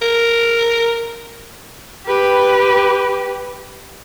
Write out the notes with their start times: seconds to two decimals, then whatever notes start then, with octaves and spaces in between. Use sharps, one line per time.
0.01 A#4
2.06 G4 B4